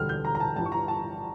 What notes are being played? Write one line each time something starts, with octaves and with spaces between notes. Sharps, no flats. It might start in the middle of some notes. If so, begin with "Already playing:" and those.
Already playing: E1 D2 D3 G3 F6
G6
A#5
A#5
A5
G1 G2 E3 G3 A5
C#6
A#5
A5